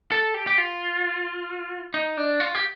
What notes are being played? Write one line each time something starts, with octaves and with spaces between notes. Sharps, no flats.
A4
G4
G4
F4
D#4
D4
F4
G4